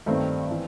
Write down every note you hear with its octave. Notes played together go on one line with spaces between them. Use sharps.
G2 D#3 A3 C4
E3